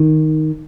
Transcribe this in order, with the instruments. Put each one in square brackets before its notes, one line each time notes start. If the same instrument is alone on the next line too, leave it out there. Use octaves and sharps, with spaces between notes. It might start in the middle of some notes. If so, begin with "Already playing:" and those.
Already playing: [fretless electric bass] D#3